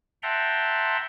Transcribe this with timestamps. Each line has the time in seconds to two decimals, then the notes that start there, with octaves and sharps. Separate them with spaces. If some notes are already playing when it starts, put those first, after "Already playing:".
0.23 E5 F#5 G5 A5 A#5 C6